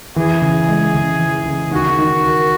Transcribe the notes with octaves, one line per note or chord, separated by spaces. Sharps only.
E3 G#4
C#3
G#3
C#3
E3
C#3
D#3 F#4
D#3
A#4